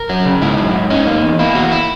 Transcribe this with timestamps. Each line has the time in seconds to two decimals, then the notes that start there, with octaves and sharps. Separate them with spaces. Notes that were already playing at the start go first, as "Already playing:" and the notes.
Already playing: A#4
0.09 F#3
0.26 C#3
0.42 G#2 E4
0.58 F#3
0.75 G#2
0.90 C#4 D#4
1.07 A#3
1.23 E2
1.39 A#3 E4
1.55 E2 F#4
1.72 E4